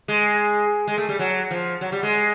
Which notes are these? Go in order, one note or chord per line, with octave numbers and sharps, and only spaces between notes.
G#3
G#3
A3
G3
F#3
F3
F#3
G3
G#3